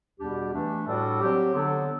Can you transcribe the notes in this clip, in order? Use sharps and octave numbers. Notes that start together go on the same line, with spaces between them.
E2 B2 G3 D4 G4
E3 A3 D4
A2 G3 D4 F#4 A4
F#3 C4 G4
D3 F#3 B3 D4 A4